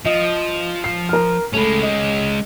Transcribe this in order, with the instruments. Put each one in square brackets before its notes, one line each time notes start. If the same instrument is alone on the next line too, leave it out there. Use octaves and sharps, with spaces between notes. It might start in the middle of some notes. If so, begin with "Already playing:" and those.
[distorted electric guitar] F3 [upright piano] D#5
[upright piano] C7
A#4 F6
[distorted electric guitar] G#3 C#4 [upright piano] A3 B5
[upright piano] D#5